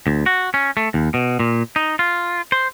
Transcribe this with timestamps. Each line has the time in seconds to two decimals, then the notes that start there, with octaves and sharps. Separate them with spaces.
0.07 D2
0.26 F#4
0.54 C#4
0.77 A3
0.94 D#2
1.14 B2
1.40 A#2
1.76 D#4
1.99 F4
2.52 C5